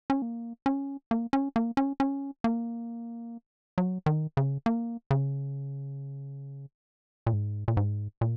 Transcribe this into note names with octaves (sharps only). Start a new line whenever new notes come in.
C#4
A#3
C#4
A#3
C#4
A#3
C#4
C#4
A#3
F#3
D#3
C#3
A#3
C#3
A#2
G#2
A#2
G#2
A#2